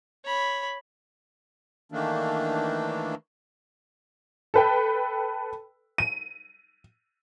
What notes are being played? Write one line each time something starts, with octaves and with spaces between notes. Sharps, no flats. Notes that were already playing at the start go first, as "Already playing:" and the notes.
C#5 B5
D#3 E3 A3 A#3 D4
A4 B4 G5
D#7